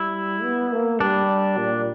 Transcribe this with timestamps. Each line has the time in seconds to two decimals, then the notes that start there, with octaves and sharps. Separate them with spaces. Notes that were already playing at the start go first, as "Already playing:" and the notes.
Already playing: G3 E4
0.43 B3
0.72 A#3
1.00 G3 D4
1.58 A#2